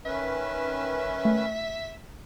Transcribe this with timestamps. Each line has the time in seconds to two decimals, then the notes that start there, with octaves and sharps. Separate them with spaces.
0.05 D#3 C#4 B4 E5
1.25 A3